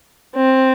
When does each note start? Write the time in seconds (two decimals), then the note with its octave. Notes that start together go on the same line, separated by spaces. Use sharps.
0.36 C4